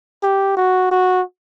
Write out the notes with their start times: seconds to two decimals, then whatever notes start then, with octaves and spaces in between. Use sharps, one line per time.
0.23 G4
0.57 F#4
0.91 F#4